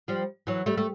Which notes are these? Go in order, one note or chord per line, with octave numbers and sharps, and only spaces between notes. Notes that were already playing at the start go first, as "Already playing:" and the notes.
F3 G3
E3 F#3
G3 A3
A3